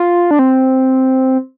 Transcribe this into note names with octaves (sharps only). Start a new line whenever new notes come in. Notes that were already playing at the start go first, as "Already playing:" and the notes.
Already playing: F4
D4
C4